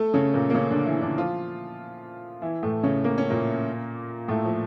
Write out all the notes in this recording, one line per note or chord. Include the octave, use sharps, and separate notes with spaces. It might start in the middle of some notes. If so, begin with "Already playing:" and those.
Already playing: A3 A4
C#3 C#4
A#2 A#3
A#3
C#3 C#4
D3 D4
E3 E4
D3 D4
F3 F4
E3 E4
A2 A3
C#3 C#4
A#3
C#4
A#2 A#3
A2 A3
F3